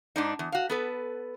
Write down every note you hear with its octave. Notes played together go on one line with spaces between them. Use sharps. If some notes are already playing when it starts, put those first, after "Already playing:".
G#2 D4 D#4
E2
F#4 F5
B3 A4 B4